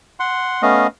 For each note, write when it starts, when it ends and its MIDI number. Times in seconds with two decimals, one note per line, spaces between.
0.20 0.62 78
0.20 0.62 84
0.62 0.87 57
0.62 0.87 59
0.62 0.87 61
0.62 0.87 75
0.62 0.87 77